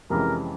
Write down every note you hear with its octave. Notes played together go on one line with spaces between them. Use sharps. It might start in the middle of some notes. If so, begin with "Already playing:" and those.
F2 C3 E3 G#3 C#4 A#4